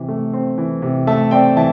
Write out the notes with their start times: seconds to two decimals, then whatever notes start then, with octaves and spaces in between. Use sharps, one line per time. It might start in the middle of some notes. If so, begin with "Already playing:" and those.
Already playing: C3 E3
0.08 A3
0.33 C4
0.58 E3
0.82 C3
1.07 A3 E5 A5
1.31 C4 D5 G5
1.57 E3 E5 A5